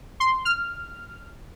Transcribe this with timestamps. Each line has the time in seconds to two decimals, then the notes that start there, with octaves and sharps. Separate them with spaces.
0.20 C6
0.45 F6